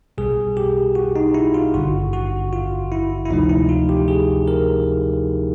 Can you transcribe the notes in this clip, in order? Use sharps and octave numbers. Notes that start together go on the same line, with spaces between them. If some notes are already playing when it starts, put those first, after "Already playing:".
B1 B2 G3 G#4
G4
F#4
D#4
E4
F4
G#1 G2 D3 F#4
F#4
F4
E4
E4
D2 C3 F3 A3 D#4
E4
F4
G4
G#4
A#4